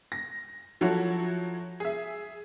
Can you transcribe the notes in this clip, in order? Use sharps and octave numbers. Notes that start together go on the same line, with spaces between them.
A#6
F3 F#3 E4 F#4 A4 C#5
G#4 E5